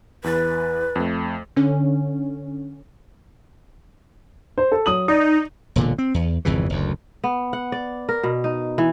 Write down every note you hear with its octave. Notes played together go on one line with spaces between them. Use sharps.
E2 E3 B4 A6
F2 A3
D3 C#4
C5
A4
F#3 D#6 F#7
D#4 D5
E1 A#2 D3
C4
E2
G#1 F2 C#3 E3
F#1 D2
B3
F#5
D5
A#4
B2
D#4
E3